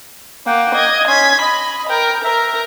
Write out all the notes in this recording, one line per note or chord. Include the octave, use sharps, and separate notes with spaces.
A#3 F#5 G5
D#5 G#6
C#4 C6 G#6 B6
D#5 B5
A#4 G5
A#4 E5 A#5